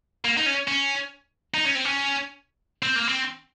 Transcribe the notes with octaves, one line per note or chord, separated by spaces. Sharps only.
A#3
D#4
C#4
C#4
D#4
C#4
C4
C#4
C4
A#3
C4